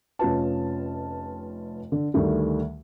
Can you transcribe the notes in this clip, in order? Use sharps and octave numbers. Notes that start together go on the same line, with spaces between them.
F1 C#4 F4 B4 A5
D3
D2 D#3 G3 A3